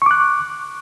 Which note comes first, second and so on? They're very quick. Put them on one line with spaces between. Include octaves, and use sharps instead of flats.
C#6 D6 F#6